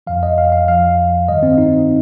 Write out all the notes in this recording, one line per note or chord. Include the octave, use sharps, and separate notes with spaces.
F2 F3 F5
D#5
F5
F5
F2 F3 F5
G2 D#3 G3 D#5
C4
D#4